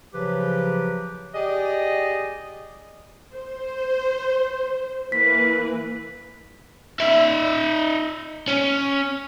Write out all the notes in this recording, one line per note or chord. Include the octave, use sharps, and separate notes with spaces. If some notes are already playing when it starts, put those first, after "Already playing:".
C#3 F3 F#3 G4 B4
G4 G#4 D5 D#5
C5
E3 A#3 B4 B6
D#4 E5
C#4